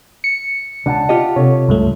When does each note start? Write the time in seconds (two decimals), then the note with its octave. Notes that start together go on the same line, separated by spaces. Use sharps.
0.24 C#7
0.86 C#2 D4 F#5 A5
1.09 F4 G4 D#5
1.36 C3 A4 C#5
1.68 C#2 G2 A3